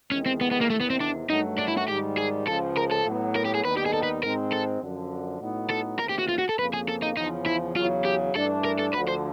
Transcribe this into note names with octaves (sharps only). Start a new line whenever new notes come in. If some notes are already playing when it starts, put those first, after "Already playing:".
E2 C3 D#3 G#3 C#4
C4
B3
B3
A#3
E2 C3 D#3 A3
B3
C4
D4
G2 D#3 F#3 A3 D#4
D4
E4
F#4
G#2 D#3 G3 G4
G#4
C#2 C#3 F3 A4
A#4
A4
A2 F#3 B3
A#4
G4
G#4
D#2 D#3 G3 B3 D#4 B4
G4
G#4
A4
B4
G#2 D#3 G#3 C4 A#4
A4
F#2 D3 F3
A2 F#3 B3 D#4
A4
D#2 C#3 E3 A3 C4 A#4
G4
F#4
F4
F#4
A4
F2 C#3 F3 A#3 B4
G#4
A4
D#4
E2 C#3 F3 D#4
E4
E2 C#3 F#3 F4
G4
G2 E3 A3 D4 A4
A#4
A4
D2 D3 F3 B4
C5